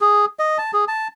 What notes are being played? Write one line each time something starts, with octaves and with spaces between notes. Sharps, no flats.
G#4
D#5
A5
G#4
A5